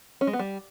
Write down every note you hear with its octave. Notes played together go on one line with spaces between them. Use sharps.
C#4
G#3
B3
G3